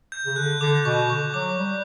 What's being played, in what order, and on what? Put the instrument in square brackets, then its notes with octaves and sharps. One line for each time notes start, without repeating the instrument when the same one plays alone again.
[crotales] G6
[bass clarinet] C#3
[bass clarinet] D3 [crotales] F#6
[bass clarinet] D3 [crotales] D6
[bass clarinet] B2 [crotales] C#6
[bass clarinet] D3 [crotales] C#6
[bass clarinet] F#3 [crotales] D6
[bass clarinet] G3